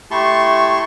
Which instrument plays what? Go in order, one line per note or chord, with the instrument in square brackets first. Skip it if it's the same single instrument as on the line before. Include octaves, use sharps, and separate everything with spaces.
[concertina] A3 E4 G4 A5 C6 C#6